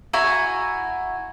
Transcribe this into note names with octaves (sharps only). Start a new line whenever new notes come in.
E4 F#4 G#5 A#5